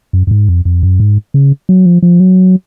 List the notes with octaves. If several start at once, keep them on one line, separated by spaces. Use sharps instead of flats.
F#2
F#2
G#2
F2
F2
F#2
G#2
C#3
F#3
F3
F3
F#3